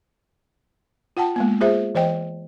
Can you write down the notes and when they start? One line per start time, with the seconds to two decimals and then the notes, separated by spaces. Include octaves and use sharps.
1.17 F4 F#5 G5 A5
1.36 G#3 A#3 B3
1.61 F4 G#4 C5 E5
1.95 E3 C5 D#5 G5